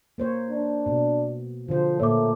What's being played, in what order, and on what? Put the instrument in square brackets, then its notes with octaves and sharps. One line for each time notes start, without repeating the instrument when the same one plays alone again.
[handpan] A#3 C5 C#5
[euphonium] D4
[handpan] B2
[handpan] D3 C5 [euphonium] F3
[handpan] A#2 A#3 [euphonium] A3 [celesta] C#5 D6